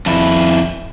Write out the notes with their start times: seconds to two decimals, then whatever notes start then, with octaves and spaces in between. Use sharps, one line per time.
0.06 F2 E4